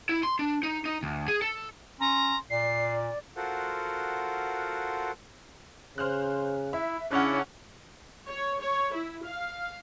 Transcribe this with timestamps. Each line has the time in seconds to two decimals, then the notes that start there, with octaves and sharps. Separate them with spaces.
0.09 E4
0.23 C6
0.39 D4
0.63 D#4
0.85 D#4
1.03 D2
1.28 G#4
1.42 A4
2.00 C#4 A#5 C6
2.50 A#2 D5 C7
3.36 F4 F#4 A4 A#4 C5 F#5
5.98 C#3 C5 F6 F#6
6.73 E4 E5
7.11 C#3 C#4 D4 E4 F#5 F6 F#6
8.29 C#5
8.61 C#5
8.93 E4
9.24 F5